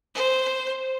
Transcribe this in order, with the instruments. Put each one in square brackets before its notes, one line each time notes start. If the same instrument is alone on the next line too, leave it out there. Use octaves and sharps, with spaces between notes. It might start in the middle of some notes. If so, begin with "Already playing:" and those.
[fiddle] C5